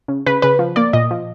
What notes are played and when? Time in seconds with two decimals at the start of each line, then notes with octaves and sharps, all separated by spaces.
0.08 C#3
0.26 C#3 B4
0.42 C#3 B4
0.59 F3
0.76 A#3 D5
0.93 A#2 D#5
1.11 F3